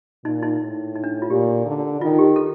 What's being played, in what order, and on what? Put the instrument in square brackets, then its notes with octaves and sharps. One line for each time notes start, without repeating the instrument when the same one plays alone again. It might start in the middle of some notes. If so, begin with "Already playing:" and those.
[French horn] A#2 [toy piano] D#4
[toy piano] D#4
[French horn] A2
[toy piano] D#4
D4
F4
[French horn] A#2 [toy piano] G4
[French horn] D3
[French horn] D#3 [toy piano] F4
[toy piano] G4
A4